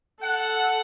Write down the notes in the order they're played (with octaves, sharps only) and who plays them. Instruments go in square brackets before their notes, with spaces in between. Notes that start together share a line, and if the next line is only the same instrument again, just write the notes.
[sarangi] A4 [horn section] F#5